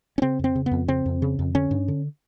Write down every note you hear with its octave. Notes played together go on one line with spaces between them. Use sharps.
C#4
C#3 C4
F2 C4
C#3
B3
F2
C#3 C4
F2
C#3
F2
D3 C#4
G2
D3